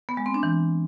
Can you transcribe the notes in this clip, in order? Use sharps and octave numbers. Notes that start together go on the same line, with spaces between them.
B3
G#3
C4
D4
E3